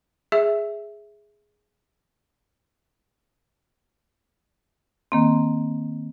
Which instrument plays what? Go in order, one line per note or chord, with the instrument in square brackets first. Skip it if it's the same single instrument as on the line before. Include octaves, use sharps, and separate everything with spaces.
[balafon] G#4 E5
[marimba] D#3 A#3 C4